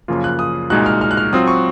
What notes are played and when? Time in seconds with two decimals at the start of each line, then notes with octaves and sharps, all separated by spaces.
0.08 F#2 C#3 F3 A#3 F4
0.24 F#6
0.39 D#6
0.70 C2 A#2 G#3 D#4 F#4 F#6
0.86 F6
1.01 F6
1.11 F#6
1.17 F6
1.33 F#3 C4 F4 D#6
1.48 C#6